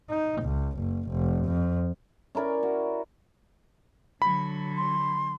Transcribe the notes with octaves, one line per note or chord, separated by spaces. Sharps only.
D#4
C#2
F#1
F1
F2
C#4 E4 A#4 D5
F#4
D3 F#3 B5
C6